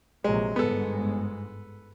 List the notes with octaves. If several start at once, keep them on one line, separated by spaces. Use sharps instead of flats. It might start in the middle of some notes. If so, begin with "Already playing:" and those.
A#1 C3 F#3 G#3
G1 G#2 G#3 B3 A4